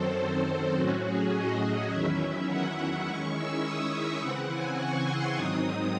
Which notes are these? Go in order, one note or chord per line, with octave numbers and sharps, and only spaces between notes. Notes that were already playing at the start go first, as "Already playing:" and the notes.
Already playing: F#2 D#3 F#3 C4 A4 C5
A4
A4
A2 F#3 C#4 F#4
G#4
D#5
E2 D#3 F#3 C#4 E4 E5
F#5
D#3 G#3 C#4 E4 C#6
E6
D#6
E5
C#3 E3 C4 E4 F#5
G#5
C#6
C6
G#2 D#3 F#3 C4 D#4 D#6